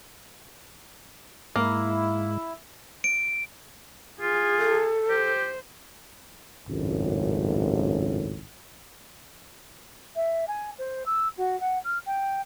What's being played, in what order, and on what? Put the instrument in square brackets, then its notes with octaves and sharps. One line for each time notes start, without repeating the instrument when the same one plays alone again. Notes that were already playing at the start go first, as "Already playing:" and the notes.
[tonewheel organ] G#2 G#3 [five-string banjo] A#3 [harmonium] E4
[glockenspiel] D7
[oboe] F4 [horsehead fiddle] G#4
[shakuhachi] A4
[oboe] G4 [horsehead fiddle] C5
[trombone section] G#1 C#2 F#2 A2
[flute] E5
G#5
C5
E6
F#4
F#5
F6
G5